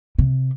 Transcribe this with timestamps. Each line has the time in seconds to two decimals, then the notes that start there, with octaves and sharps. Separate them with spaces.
0.19 C3